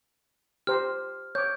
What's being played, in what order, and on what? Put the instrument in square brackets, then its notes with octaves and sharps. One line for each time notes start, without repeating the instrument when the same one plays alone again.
[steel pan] G4 C5 A#5 [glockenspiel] F6
[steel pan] C#5 D6 [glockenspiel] G6